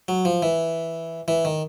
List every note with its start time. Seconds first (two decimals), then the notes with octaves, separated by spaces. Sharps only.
0.08 F#3
0.25 F3
0.42 E3
1.28 E3
1.45 D#3